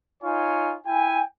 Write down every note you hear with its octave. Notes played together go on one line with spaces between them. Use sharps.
D#4 F4 C#5 G#5
E4 G5 G#5